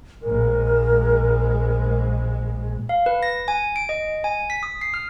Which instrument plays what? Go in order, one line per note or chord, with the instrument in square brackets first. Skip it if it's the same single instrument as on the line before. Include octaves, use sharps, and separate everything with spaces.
[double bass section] A#1 G#3 [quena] A#4
[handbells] F5
B4
A#6
G#5
D7
D#5
G#5
B6
D#6
C7
F6